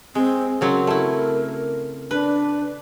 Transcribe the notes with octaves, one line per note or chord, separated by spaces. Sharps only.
G#3 C4
C#3 F#3 C4 A#4
A3 E4
D4 B4